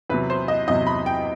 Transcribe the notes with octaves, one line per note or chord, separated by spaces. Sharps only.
E2 C3 F#3 B4
C5
D#5
E2 C3 F#3 D#5
B5
G5